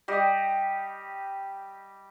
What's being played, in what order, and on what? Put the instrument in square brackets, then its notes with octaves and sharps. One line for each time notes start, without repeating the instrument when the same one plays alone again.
[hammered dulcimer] G3 G4 D#5